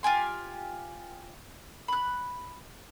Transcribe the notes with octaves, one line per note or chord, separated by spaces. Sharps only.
F4 G4 G#5 C6
B5 F#6